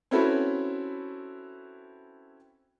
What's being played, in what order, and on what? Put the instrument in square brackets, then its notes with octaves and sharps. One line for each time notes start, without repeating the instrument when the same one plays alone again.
[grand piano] C4 C#4 E4 F#4 A4 B4